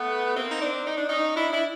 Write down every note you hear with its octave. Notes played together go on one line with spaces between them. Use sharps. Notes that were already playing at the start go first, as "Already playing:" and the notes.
Already playing: A3 B3
A#3 C4
D#4
C4 D4
D#4
D4
C#4 D#4
D4 E4
D4 E4